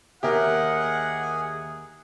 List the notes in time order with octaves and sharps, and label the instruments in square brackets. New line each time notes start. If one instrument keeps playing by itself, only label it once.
[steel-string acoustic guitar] D#2 E5 [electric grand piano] G4 A#4 [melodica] G#4 [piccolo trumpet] F#5